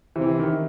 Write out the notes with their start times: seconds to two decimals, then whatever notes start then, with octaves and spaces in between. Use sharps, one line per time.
0.16 C3 E3
0.39 D#3